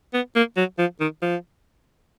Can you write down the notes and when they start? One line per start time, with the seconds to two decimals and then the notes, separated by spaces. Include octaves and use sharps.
0.14 B3
0.36 A#3
0.57 F#3
0.78 F3
1.00 D#3
1.22 F3